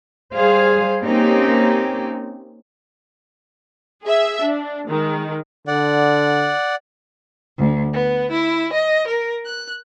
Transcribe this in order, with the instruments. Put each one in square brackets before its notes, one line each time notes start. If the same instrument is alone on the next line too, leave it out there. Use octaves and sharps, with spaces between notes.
[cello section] G3 G#4 C5 F5
A#3 C4 C#4 D#4 G4
[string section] G#4 E5
D4
D#3 G#3
[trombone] D3 [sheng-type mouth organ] D5 F#5
[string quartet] D2
B3
E4
D#5
A#4
F#6